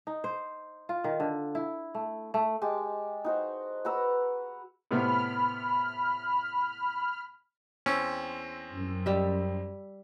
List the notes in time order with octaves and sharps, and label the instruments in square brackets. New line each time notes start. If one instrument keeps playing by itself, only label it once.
[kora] D#4
C5
F4
D#3
D3
E4
A3
A3
[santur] G#3 G4 A5
D#4 F#4 C5
F#4 B4 A#5 E6
[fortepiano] A2 C3 B3 [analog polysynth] B5 F6
[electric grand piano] E2 C4 E6 [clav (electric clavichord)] C#4
[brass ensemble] F#2
[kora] G3 E5